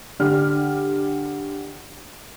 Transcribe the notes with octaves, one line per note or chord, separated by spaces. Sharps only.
D3 G4 F6